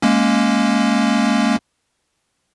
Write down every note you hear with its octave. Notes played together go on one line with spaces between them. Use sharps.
G#3 A#3 C#4